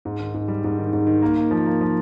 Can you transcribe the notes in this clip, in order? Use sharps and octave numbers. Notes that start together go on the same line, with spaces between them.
G#2
D#3
G#2
G3
G#2
D#3
G#2
D#3
A#3
A#3
F3
A#3
F3